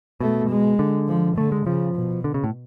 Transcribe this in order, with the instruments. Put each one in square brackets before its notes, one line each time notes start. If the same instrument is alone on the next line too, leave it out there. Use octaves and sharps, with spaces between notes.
[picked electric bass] B2 [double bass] A3
[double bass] G#3
[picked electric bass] D3
[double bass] F3
[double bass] D3 [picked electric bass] A3
[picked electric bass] G#3
[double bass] C#3 [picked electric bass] F3
[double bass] B2
[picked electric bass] D3
C#3
A2